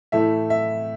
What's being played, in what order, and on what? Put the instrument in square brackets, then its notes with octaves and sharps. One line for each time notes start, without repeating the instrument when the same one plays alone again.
[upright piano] A2 E3 A3 E5
E5